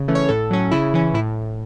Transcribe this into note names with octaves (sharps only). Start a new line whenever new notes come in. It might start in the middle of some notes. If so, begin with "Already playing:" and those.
Already playing: C#3
E3 A3 C#4
C#5
A2 A4
F#3 C#4
C#3 E4
E3 C#4
A2 E4